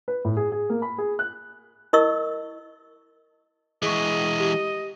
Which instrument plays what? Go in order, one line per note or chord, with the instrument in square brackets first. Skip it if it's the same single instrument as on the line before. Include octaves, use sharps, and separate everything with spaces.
[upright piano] B4
A2
G#4
G#4
A#3
B5
G#4
F#6
[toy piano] E4 A#4 D#5 C#6 E6
[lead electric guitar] E3 G#3 [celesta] G#4 C#6 [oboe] D#5
[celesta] G4